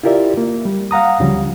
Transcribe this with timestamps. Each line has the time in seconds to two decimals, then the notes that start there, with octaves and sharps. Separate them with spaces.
0.03 E4 F4 G4 A#4 D5 E5
0.37 A#3
0.65 G3
0.91 F5 F#5 A#5 D#6
1.20 D2 C#3 F3 G3 C#4